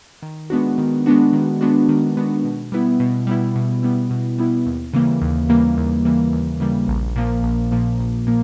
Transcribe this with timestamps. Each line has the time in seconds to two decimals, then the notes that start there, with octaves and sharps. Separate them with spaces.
0.22 D#3
0.50 G#3 B3 D4 F#4
0.78 D#3
1.06 G#3 B3 D4 F#4
1.33 D#3
1.61 G#3 B3 D4 F#4
1.89 D#3
2.17 G#3 B3 D4 F#4
2.44 B2
2.72 G3 B3 E4
3.00 B2
3.27 G3 B3 E4
3.56 B2
3.83 G3 B3 E4
4.10 B2
4.38 G3 B3 E4
4.66 D#2
4.93 C#3 E3 G3 A#3
5.22 D#2
5.49 C#3 E3 G3 A#3
5.77 D#2
6.05 C#3 E3 G3 A#3
6.33 D#2
6.60 C#3 E3 G3 A#3
6.88 A#1
7.16 A#2 F3 A#3
7.43 A#1
7.71 A#2 F3 A#3
7.99 A#1
8.27 A#2 F3 A#3